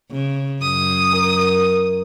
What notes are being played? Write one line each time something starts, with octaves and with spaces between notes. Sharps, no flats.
C#3
F#2 D#6
A#4